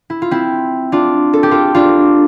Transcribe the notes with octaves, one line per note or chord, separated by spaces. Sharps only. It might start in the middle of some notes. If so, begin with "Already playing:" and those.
E4
F4
C4 E4
D4 F4
A4
G4
F4 A4
D4 F4